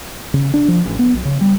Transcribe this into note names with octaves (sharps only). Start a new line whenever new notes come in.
C#3
D4
F3
A1
B3
B1
C#3
G3